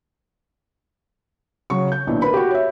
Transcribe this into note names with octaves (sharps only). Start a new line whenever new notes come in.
C#3 F#3 C#6
G6
B1 A#2 D#3 D4 E4
A#4 B4 B5
F#4 G4
C#5 E5